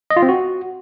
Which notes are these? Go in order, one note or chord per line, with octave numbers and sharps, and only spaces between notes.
D#5
F4
C4
F#4